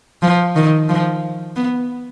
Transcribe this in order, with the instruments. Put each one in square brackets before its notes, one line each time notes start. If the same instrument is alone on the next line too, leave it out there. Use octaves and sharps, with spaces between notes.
[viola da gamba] F3
D#3
F3
B3